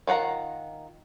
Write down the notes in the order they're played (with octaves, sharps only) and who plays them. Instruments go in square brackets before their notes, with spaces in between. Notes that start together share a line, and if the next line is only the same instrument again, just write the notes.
[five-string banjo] D#3 F4 F#5 A#5